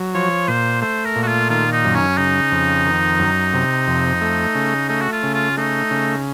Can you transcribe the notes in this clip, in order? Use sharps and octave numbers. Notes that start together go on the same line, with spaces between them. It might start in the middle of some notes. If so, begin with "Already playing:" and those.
Already playing: F#3
F3 C#5
A#2 C5
A3 C5
A#4
A#2
F#4
F4
D#3 F4
D#4
F#2
C#4
C#3 D#4
F2
D#3
F#2
C3
F2
A3
C#3
A3 D#4
F#4
F4
C#3
F4
A3 D#4
C#3